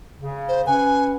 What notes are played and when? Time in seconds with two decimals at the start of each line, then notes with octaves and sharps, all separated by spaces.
0.21 C#3
0.48 C5
0.66 C#4 B4 F#5 G#5